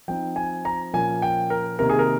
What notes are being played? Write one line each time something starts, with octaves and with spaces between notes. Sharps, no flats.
F3 C4 D#4 G5
G#5
A#5
A#2 F3 A#3 C#4 G#5
G5
A#4
C3 D#3 A#3 A#4
G#4
A#4